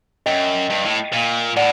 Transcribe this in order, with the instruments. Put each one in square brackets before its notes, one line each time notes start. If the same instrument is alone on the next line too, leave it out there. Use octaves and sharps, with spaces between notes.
[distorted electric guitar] F#2 [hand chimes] D#5 G5
[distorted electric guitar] G2
A2
A#2
[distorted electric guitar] A2 [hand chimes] D5 F#5